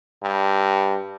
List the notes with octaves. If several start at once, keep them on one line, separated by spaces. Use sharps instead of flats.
G2